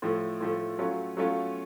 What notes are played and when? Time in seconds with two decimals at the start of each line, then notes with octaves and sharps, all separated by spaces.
0.02 A2 F3 A3
0.40 A2 F3 A3
0.78 F#3 A3 C#4 F4
1.17 F#3 A3 C#4 F4